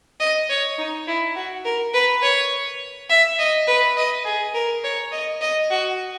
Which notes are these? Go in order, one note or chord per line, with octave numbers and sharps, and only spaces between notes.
D#5
C#5
D#4
E4
F#4
A#4
B4
C#5
E5
D#5
B4
D#5
G#4
A#4
C#5
D#5
D#5
F#4